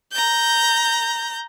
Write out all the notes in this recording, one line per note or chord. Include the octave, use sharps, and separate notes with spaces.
A#5 G6